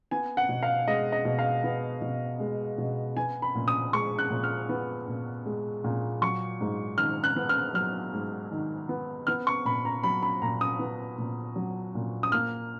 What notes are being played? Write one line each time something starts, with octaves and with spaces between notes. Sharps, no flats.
B3 G#5
F#5
B2
F5
G#3 D#5
D#5
B2
F5
B3
B2
G#3
B2
B3 G#5
B5
A#2
D#6
G#3 C#6
F#6
A#2
F6
B3
A#2
G#3
A#2
F#3 C#6
G#2
D#3 F6
F#6
B3
F6
F#3 F6
G#2
D#3
B3
B3 F6
C#6
A#2 B5
A#5
F#3 B5
B5
A#2 A#5
D#6
B3
A#2
F#3
A#2
D#6
A#3 F6